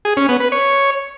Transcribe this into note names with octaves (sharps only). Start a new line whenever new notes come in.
G#4
C#4
B3
B4
C#5